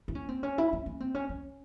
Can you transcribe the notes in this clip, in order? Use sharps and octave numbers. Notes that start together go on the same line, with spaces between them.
E4
C#4
C4
C#4
E4
C#4
C#4
C4
C#4
C#4